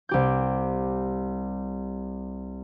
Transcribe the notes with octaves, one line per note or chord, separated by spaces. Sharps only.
C2 G4 G6